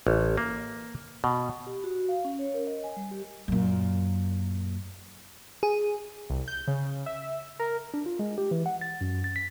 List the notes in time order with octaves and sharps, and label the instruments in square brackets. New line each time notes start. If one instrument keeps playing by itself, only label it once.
[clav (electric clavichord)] A1
A#3
B2
[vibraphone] G4
F#4
F5
C#4
C#5
A#4
D#5
G#5
G3
G4
[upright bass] F#2 A#2
[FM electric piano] G#4
[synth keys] C2
G6
C#3
E5
A#4
[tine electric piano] D4
F4
G#3
G4
E3
F#5
A6
F#2
A6
B6